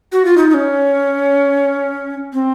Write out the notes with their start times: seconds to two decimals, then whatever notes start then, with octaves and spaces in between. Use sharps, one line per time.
0.12 F#4
0.25 F4
0.38 D#4
0.50 D#4
0.54 C#4
2.33 C4